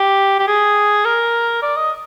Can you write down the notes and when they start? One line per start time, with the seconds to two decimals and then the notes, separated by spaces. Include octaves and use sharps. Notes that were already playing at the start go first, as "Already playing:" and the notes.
Already playing: G4
0.39 G4
0.47 G#4
1.05 A#4
1.62 D5
1.76 D#5